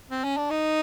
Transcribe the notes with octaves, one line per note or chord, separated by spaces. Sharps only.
C4
C#4
D4
D#4